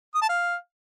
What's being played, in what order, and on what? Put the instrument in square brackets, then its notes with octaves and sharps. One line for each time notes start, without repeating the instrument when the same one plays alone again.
[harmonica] D#6
A5
F5